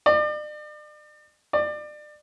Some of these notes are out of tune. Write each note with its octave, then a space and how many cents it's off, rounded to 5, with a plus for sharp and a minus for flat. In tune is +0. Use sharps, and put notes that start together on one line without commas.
D5 +40
D5 +30